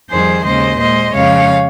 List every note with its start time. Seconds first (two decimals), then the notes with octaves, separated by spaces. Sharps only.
0.10 F2 D#3 G3 G#4 C5
0.44 D#2 C#3 G#3 C5 D#5
0.79 A#2 G#3 C5 D#5
1.13 F2 C#3 G#3 C#5 F5